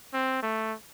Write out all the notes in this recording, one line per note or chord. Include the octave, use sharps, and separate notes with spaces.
C4
A3